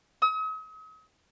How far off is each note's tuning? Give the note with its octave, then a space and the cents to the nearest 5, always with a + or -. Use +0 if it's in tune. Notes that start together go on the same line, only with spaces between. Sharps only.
D#6 +45